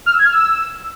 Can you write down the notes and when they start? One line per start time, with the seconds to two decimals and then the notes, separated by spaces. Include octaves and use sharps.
0.06 F6
0.13 E6
0.19 G#6
0.25 F6
0.32 E6